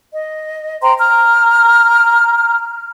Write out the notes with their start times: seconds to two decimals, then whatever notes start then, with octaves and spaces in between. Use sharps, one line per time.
0.13 D#5
0.81 C5 G5 A#5 C6
0.98 A#5 F6